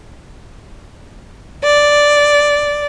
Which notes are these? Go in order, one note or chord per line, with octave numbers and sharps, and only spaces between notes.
D5